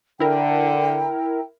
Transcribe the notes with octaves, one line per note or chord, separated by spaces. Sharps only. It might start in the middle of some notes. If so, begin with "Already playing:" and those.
D3 E4 A#4 G5